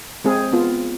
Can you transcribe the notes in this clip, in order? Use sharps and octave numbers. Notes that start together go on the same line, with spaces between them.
G#3 C4 G#4
B3 F4